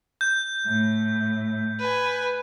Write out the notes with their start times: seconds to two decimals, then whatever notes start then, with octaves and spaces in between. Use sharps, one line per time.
0.21 G6
0.66 A2
1.79 B4 G#5